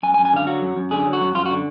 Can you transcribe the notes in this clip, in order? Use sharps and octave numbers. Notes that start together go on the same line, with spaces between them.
F#2 G#5
G#5
F#2
G#5
D3 F5
F#3 F#4
F#2
F#2
D3 G#4
F#3
F#4
F#2
F#2 F4
F#4
D3